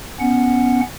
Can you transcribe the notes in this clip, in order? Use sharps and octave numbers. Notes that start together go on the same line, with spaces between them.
B3 C#4 F#5